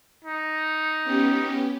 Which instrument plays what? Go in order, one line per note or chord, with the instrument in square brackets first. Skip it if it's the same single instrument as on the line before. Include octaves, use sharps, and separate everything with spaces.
[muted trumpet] D#4
[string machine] B3 C#4 G4